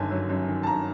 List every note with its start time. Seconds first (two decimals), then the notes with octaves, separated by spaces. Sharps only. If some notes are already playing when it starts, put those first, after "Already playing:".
Already playing: G1 F#2 D#3 G#5 A5
0.11 F#3
0.30 F#2
0.48 D#3
0.63 A5
0.67 G1 A#5